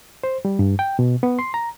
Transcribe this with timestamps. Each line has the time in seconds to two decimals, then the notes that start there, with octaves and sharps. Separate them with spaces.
0.24 C5
0.45 G3
0.59 G2
0.79 G5
0.99 B2
1.23 B3
1.39 C6
1.54 A#5